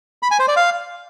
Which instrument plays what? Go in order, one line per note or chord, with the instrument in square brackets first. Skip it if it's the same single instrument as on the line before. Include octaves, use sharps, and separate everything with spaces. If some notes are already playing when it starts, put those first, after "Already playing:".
[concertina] B5
G#5
C5
D5
F5